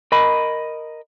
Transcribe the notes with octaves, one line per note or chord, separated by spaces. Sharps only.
A#4 D#5 B5